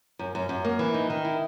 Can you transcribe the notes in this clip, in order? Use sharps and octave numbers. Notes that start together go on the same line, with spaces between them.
F#2
F#2
F#2
A#3
E3
D#4
D#3
E4